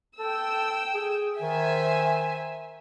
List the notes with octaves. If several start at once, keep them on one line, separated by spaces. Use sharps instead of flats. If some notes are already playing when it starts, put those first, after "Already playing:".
A4 G5 E6
G#4
D#3 C5 E5 G#5